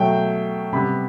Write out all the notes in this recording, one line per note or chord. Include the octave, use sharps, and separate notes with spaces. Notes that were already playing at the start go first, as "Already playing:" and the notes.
Already playing: B2 F#3 A3 G5
C3 G3 B3 B5